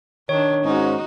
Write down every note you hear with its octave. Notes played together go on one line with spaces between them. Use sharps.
D#3 D4 C#5
G#2 C#4 D#4 F#4